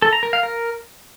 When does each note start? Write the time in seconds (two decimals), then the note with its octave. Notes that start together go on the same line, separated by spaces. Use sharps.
0.02 A4
0.13 A#5
0.23 A#4
0.33 F5
0.43 A#4